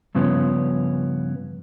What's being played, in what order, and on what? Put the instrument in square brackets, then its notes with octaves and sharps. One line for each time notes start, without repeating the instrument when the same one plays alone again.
[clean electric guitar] G2 C#3 F3 B3 C#4